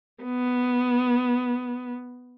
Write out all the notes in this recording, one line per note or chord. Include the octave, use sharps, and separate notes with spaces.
B3